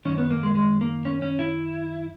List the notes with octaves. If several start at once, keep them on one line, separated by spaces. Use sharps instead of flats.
F#2 D#3 C#4
B3
A#3
G#3
G#3
A#3
C#4
C#4
E4